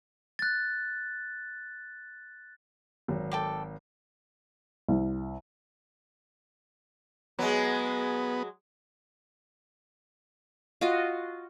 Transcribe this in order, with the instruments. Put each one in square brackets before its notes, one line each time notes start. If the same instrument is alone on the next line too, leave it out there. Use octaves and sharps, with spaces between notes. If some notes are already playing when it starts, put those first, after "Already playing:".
[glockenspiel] F#6 A6
[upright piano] G#1 F#3
[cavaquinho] A4 G5 D6
[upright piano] C2
[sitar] F#3 G#3 [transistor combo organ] B3
[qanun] F4 F#4 D#5